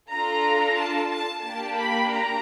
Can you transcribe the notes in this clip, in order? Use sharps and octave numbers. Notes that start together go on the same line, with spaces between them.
D4 F4 A4 A#5
A5
A5
A#3 D4 G4 A5
B5
A#5